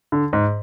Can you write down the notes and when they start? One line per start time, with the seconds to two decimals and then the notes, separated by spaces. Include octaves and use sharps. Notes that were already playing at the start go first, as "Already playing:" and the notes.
0.12 D3
0.33 G#2